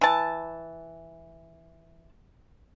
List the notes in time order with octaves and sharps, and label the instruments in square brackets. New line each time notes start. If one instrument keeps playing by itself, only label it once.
[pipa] E3 A5